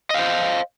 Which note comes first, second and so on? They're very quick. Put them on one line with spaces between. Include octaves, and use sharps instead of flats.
D#5 F5 C5